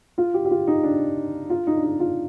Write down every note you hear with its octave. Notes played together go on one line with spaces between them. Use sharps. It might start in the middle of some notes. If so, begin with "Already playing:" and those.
F4
G4
G4
F4
D#4
D4
F4
D#4
D4
D#4
F4